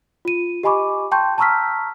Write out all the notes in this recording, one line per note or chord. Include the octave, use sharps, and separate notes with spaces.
F4 D#7
G4 D#5 G#5 B5 C#6 D6
G5 A5 C6 C#6 G6
A5 A#5 C#6 E6 F6 B6